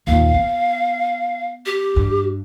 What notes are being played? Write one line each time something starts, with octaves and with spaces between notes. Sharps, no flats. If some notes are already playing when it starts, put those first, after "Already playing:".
D#2 A#2 F5
B3
G4
G2